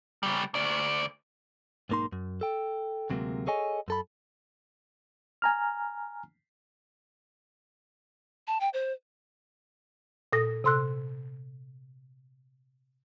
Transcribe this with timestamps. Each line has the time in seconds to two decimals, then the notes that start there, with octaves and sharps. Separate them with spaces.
0.23 C#3 G3
0.54 D2 D5
1.89 B1 G#2 A#3 D#4 C6
2.12 F#2
2.41 A4 G5
3.10 D2 C3 F#3 G#3 A#3
3.47 G#4 A4 C#5 D#5 G#5
3.88 F#2 A4 B5
5.42 G#5 A#5 F6
8.47 A5
8.60 G5
8.73 C5
10.33 A#2 A4 D#6 A#6
10.64 C3 A4 C6 E6 F#6